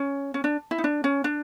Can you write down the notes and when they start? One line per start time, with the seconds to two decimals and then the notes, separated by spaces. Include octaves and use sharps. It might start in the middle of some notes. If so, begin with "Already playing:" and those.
Already playing: C#4
0.34 C#4
0.44 D4
0.71 E4
0.78 D#4
0.84 D4
1.04 C#4
1.24 D4